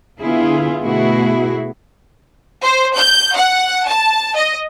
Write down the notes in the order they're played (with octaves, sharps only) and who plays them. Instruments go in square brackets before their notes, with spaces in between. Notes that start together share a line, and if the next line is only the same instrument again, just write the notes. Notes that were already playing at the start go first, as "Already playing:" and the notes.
[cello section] D3 B3 E4 F4 G#4
B2 A3 B3 E4 F#4 G#4
[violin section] C5
G6
F#5
A5
D#5